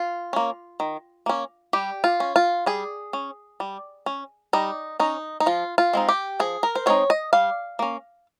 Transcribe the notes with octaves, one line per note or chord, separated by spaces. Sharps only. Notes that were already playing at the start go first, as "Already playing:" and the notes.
Already playing: F4
A#3 C#4
D#3
A#3 C#4
G3 G4
F4
C#4
F4
G3 G#4
C#4
G3
C#4
G3 D#4
C#4 D#4
D#4
F3 F4
F4
G#3 C4 D#4
G4
F3 G#4
A#4
C5
G#3 C4 D#4 C#5
D#5
G3 F5
A#3 C#4